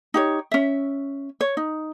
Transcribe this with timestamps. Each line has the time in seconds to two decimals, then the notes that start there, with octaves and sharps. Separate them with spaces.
0.14 D#4 G4 C#5
0.52 C#4 E5
1.41 C#5
1.57 D#4